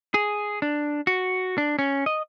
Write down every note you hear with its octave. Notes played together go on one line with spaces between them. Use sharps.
G#4
D4
F#4
D4
C#4
D#5